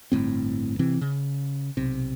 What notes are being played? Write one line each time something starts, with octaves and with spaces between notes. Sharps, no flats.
G1 A2 C4
C3 E3 C4
C#3
B1 C3